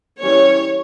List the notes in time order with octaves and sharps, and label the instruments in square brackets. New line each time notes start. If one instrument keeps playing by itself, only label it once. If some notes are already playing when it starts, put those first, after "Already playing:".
[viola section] E3 G3 C#4 C#5